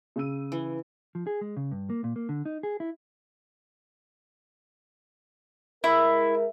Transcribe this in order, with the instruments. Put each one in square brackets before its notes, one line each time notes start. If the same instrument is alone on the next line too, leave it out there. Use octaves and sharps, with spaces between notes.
[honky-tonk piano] C#3 E6 D#7
[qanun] E3
[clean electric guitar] F3
G#4
G#3
C#3
G2
A#3
A#2
A#3
D3
D#4
G#4
E4
[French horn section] G#3 A#4 [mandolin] E4